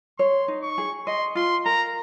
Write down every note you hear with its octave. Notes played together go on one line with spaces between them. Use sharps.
C#5 C6
D#4
C#6
G#4
D#5 C6
F4 C6
A#4 A#5